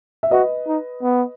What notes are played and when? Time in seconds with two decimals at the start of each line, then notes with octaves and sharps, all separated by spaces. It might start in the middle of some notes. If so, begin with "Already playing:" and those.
0.23 E5
0.31 F#4 B4 D#5
0.67 D#4
1.03 B3